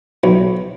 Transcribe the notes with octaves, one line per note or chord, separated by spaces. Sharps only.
B1